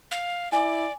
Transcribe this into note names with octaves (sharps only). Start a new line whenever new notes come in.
F5
E4 D5 G#5 D6